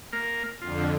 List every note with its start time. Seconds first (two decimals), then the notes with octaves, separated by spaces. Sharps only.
0.13 A#3 A#4
0.62 F2 D3 F4